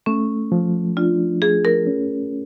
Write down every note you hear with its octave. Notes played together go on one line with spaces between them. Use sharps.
A3 C#4
F3
D4 F4
A3 G#4
A#4
C#4